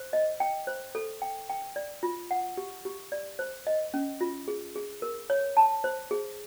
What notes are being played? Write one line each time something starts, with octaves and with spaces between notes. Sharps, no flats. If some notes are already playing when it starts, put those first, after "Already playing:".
Already playing: C5
D#5
G5
C5
A4
G5
G5
D5
F4
F#5
G4
G4
D5
C5
D#5
C#4
F4
G#4
G#4
A#4
C#5
A5
C5
G#4